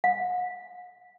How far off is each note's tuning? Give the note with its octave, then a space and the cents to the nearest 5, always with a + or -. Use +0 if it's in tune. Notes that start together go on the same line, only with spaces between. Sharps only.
F#5 -40